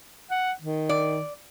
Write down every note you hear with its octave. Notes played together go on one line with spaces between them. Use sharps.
F#5
D#3
D5